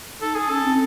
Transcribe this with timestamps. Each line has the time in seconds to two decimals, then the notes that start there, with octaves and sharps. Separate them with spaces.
0.21 D#4 A4
0.35 G#4
0.49 C#4 A4
0.63 C4